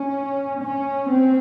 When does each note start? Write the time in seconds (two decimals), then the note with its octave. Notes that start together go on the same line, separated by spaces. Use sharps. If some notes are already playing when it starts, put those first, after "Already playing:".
Already playing: C#4
0.62 C#4
1.09 C4